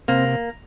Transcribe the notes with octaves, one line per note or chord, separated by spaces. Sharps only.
C3 A#3 C4